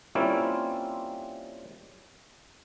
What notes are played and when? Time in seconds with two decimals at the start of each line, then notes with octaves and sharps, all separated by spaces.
0.15 G3 A#3 C4 C#4 E4 F4